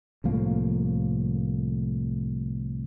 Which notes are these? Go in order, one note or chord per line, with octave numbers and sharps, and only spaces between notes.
C2 A2 F3 A#3